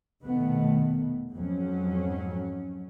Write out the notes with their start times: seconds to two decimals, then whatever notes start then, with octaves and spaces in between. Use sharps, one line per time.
0.22 F1 B2 D#3 A3 B3
1.34 F2 G#2 F#3 C#4